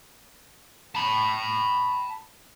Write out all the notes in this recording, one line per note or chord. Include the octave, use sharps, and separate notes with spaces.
A5 B5